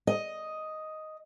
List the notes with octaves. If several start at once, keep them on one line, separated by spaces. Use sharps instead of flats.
D#5